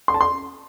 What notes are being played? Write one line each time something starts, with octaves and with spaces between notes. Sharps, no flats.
C6
A5
C6